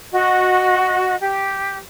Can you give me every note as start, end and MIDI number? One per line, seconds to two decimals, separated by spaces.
0.12 1.15 66
0.12 1.15 75
1.19 1.77 67